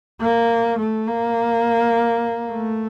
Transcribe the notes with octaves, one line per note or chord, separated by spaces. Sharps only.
A#3
A3
A#3
A3